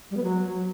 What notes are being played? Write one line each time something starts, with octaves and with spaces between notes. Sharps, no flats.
G3
B3
F#3